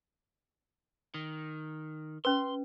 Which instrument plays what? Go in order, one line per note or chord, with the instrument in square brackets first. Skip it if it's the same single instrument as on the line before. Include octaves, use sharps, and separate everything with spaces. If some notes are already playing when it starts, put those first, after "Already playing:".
[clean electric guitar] D#3
[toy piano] C#4 B4 [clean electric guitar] C6